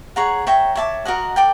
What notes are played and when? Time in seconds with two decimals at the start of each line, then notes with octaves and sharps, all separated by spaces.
0.16 G#4 C#5 F#5 A#5
0.47 C#5 E5 G5 A#5
0.75 C#5 E5 A5 D6
1.05 F#4 A#4 D#5 F#5
1.36 A4 D5 G5